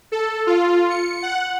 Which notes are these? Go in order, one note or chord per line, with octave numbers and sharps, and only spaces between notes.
A4
F4
C#7
F#5